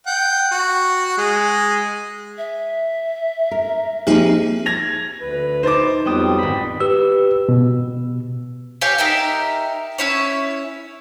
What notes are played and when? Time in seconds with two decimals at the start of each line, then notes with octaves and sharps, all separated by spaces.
0.06 F#5 G5
0.51 F#4
1.17 G#3 G#4
2.38 E5
3.51 A#4
4.07 F3 A#3 C4 D#4 G4 G#4
4.66 G#6 A#6 F7
5.21 D2 B4
5.63 D#4 C5 D6 A6
6.05 F2 F#3 G3 B3 G5 D#6
6.38 G#1 B5
6.80 G4 B4 E6
7.49 B2
8.81 G4 C#5 F5 G#5
8.98 D#4 G4 A#4 E5
9.98 C#4 E4 C#5